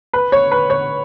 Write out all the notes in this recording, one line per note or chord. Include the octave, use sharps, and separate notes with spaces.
B4
C#5
B4
C#5